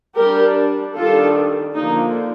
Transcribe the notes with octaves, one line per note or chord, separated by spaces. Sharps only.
G3 D4 G4 A#4
D#3 G3 D4 F4 A4
D3 F3 A#3 D#4